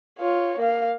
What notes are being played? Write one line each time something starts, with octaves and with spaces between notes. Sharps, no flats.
F4 C#5
A#3 F5